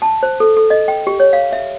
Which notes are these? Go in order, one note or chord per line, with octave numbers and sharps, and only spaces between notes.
A5
C5
A4
A4
D#5
G5
G4
C#5
F5
E5